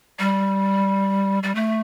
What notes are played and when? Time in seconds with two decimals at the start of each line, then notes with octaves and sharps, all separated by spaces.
0.19 G3
1.43 G3
1.55 A3